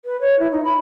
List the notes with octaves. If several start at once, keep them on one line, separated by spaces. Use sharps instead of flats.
B4
C#5
E4
D#4
B5